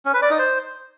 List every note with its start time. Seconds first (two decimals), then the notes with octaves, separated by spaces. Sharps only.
0.06 C#4
0.14 B4
0.22 D5
0.30 D#4
0.39 C5